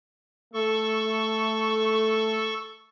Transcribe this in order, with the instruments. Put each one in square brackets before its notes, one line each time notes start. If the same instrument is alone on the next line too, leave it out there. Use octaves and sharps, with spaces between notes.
[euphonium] A3 [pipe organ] A4 C#6